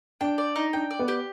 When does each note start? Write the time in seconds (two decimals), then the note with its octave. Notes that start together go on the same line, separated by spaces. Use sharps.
0.21 D4 G5
0.38 D5
0.56 D#4
0.73 D4 G5
0.91 D5
0.99 B3
1.08 G4